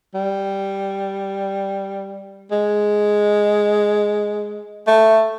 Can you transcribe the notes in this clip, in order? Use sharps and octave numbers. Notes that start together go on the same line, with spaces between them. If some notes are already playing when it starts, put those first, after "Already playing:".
G3
G#3
A3